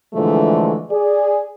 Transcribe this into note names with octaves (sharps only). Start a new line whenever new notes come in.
A#2 D3 E3 F3 G#3 A3
G#4 D5